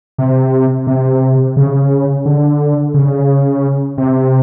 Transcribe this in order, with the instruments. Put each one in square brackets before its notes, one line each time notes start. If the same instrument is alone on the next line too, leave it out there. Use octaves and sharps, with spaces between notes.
[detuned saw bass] C3
C3
C#3
D3
C#3
C3